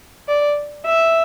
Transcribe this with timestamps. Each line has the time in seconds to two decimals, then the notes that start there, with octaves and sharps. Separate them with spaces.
0.28 D5
0.86 E5